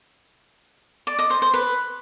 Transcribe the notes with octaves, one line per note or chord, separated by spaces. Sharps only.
D5
D#5
C5
C5
B4